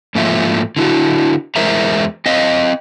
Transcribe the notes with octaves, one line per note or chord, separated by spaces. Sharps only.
G#2 F3 A3 A#3 F4 E5
D3 E4 F#4
E2 G#3 A#4 C5 E5 A#5
C4 D#5 F5